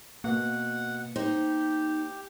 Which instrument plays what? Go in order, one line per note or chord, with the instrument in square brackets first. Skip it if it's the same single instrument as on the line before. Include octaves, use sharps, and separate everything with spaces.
[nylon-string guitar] B2 [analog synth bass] A#3 [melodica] F#5
[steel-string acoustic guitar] D#4 [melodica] G4 [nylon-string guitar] C5